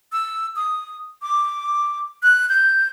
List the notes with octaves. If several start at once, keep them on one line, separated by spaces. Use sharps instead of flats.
E6
D#6
D6
F#6
G6